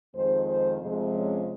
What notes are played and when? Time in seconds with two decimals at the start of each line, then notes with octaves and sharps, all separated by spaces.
0.13 F2 D#3 G#3 C5
0.47 C5
0.80 F2 C3 F3 G#3
1.14 C#4